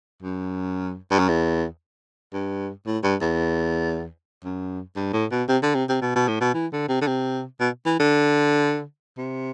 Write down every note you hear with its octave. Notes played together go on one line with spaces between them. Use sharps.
F#2
G2
F#2
E2
G2
A2
G2
E2
F#2
G2
A2
B2
C3
D3
C3
C3
B2
B2
A2
B2
E3
D3
C3
D3
C3
B2
E3
D3
C3